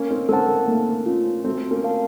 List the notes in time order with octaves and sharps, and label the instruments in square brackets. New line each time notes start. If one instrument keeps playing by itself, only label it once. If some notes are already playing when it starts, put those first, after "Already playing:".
Already playing: [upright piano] A#3 C#4
C4 D#4
[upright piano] A#3 C#4 [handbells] A4 C5 F#5 A5
[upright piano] A#3
[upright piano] A3 [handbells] A#3
[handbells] C#4 F4
[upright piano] A3 C4 [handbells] F#4
[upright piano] A#3 C#4
[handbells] A#4 F5 A5